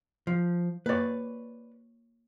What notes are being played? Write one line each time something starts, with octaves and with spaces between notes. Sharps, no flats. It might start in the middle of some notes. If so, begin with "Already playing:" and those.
F3
A#3 B4 C#5 D5